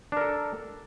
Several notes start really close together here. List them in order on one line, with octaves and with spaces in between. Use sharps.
D4 A#4 A4